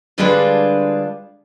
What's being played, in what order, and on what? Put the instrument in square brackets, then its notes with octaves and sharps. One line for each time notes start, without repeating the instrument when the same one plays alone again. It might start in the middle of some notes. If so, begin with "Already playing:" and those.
[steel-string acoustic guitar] D3 G3 G#3 D4 F4 B4